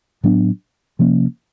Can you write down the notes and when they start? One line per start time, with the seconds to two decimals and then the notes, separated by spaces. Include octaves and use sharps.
0.23 A2 F#3 B3 D4
0.99 C3 F3 A#3 C#4